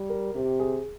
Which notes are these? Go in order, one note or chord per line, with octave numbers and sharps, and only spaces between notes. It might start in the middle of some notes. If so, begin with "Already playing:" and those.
Already playing: G3
A#4
C3 G4
G#4